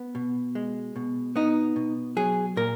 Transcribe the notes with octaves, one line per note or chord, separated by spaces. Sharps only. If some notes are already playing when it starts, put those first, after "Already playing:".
Already playing: B3
B2
G#3
B2
B3 D#4
B2
F#3 G#4
A#2 A#4